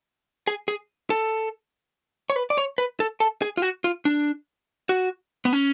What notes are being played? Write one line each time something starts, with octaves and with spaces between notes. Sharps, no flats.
G#4
G#4
A4
C#5
B4
D5
C#5
B4
A4
A4
G#4
F4
F#4
F4
D4
F#4
B3
C#4